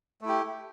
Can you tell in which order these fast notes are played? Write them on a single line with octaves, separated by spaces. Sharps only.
A3 E4 G4